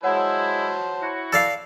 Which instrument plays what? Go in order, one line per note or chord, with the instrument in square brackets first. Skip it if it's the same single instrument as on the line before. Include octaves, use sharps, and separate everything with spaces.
[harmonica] F#3 C5 A5 [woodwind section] G#3 E4 [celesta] C#5 F#5
[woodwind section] E4 F#4
[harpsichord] A4 D5 F5